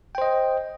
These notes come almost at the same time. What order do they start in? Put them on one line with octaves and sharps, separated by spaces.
G5 C5 D#5